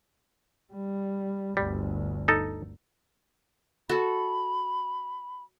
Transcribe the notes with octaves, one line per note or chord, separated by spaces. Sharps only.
G3
G1 D2 G3
D#4 A4
F#4 A4 B5